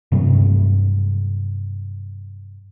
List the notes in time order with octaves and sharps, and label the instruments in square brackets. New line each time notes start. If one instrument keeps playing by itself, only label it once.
[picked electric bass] G2 C3 F#3